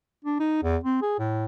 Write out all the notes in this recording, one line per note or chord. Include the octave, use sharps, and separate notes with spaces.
D4
D#4
E2
C4
G#4
A2